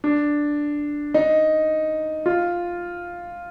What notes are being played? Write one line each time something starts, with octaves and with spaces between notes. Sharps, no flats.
D4
D#4
F4